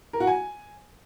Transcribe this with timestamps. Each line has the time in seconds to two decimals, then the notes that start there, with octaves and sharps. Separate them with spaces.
0.13 A#4
0.20 F#4
0.27 G#5